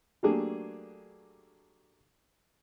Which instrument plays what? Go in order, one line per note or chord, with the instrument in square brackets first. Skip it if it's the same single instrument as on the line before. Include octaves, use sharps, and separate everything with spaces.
[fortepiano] F#3 A3 A#3 D4 G4 G#4